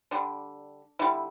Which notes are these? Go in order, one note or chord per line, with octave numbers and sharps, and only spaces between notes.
D3 G3 D4
D3 G3 E4